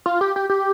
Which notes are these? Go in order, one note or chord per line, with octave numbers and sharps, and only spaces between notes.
F4
G4
G4
G4